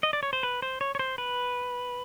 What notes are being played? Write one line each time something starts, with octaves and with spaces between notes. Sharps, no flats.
D#5
D5
C#5
C5
B4
C5
C#5
C#5
C5
B4